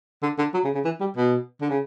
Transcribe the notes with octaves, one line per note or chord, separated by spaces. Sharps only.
D3
D3
F#3
C#3
C#3
E3
G3
B2
D3
C#3